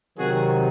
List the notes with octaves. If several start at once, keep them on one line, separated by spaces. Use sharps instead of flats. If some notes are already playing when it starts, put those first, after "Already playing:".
C3 D#3 F#3 F#4 G#4